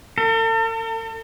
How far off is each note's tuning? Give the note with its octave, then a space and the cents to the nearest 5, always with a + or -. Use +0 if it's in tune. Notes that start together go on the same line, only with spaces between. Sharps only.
A4 +45